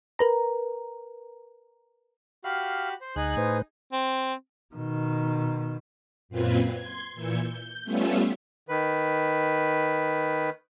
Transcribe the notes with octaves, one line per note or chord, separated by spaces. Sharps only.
A#4 B4 A#5
F#4 G4 F5 B5
C5
D2 D#4 G#4 F#6
A2 B4 C5
C4
B2 D#3
F#2 A#2 C4 F4 B4 G#6
C6 G#6
A#2 E3 E6 G6 G#6 C#7
G6
G3 A3 B3 C#4 F4 E5
D#3 B4